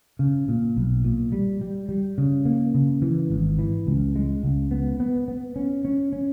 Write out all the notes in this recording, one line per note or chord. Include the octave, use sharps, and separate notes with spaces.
C#3
A#2
B1
A#2
G3
G3
G3
C#3
A#3
C#3
E3
G#1
E3
C#2
G#3
C#2
B3
B3
B3
C#4
C#4
C#4